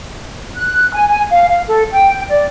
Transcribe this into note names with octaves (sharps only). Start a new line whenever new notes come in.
F#6
G#5
G#5
F5
F5
A4
G5
D5